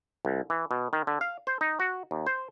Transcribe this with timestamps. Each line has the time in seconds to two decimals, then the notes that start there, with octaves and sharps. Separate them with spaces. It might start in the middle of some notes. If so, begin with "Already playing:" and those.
0.25 C2
0.50 E3
0.71 B2
0.93 D#3
1.07 D3
1.21 F5
1.47 C5
1.61 D#4
1.80 F#4
2.11 D#2
2.27 C5